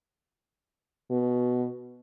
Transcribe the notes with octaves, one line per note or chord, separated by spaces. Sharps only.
B2